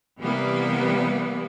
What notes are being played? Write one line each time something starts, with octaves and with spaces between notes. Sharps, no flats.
C3 E3 G3 A#3 B3